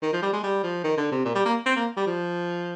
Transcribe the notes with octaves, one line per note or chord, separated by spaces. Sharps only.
D#3
F3
G3
G#3
G3
F3
D#3
D3
C3
A#2
G3
A#3
C4
A#3
G3
F3